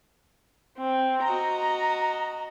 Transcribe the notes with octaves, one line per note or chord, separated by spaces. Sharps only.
C4
F#4 D#5 A#5